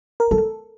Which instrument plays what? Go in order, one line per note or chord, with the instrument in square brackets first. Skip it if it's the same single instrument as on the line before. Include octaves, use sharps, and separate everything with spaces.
[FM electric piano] A#4
[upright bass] G3 [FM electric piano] A4